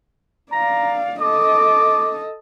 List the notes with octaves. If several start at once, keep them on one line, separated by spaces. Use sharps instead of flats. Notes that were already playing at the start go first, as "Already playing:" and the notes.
D5 F5 A#5
A4 D#5 D6